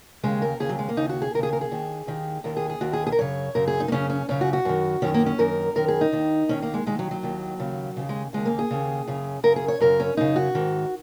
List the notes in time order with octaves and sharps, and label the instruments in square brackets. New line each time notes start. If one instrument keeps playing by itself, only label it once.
[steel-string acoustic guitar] D#2 C#3 G#3
A#4
D#2 C#3 G#4
F#3
G#3
A#3
D#2 C#3 D#4
F#4
G#4
D#2 A#4
C#3 G#4
A#4
G#4
D#2 D#3
D#2 D#3
D#2 D#3 A#4
G#4
G#4
D#2 D#3 F#4
G#4
G#4
A#4
F#2 C#3 C#5
F#2 C#3 A#4
G#4
D#4
A#3
F#2 C#3 C#4
C#4
F#2 C#3 C#4
F#4
F#4
F#2 D#3
F#2 D#3 C#4
A#3
C#4
F#2 D#3 A#4
F#2 D#3 A#4
G#4
D#4
D#2 D#3
D#2 D#3 C#4
A#3
G#3
D#2 D#3 G#3
F#3
F#3
D#2 D#3
D#2 C#3
D#2 C#3
G#3
D#2 C#3 G#3
A#3
G#4
D#2 C#3
F#2 C#3
F#2 C#3 A#4
G#4
C#5
F#2 C#3 A#4
C#4
F#2 C#3 D#4
F#4
G#2 D#3